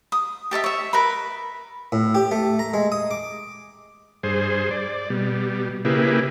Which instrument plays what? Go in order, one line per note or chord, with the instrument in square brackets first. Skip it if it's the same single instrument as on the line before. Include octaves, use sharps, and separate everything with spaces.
[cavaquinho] D#6
G4 A4 C#5 E5
C#5 E5
A#4 B4 B5
[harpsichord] A2
G4
A3
A#5
G#3
D#6
D6
[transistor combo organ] G2 G#4 C5
D5
B2 G3
C#3 A#3 E4 G4 G#4 B4